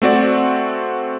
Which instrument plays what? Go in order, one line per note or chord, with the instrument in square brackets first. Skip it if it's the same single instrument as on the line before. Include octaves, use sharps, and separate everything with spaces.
[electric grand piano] A3 C4 F#4 D5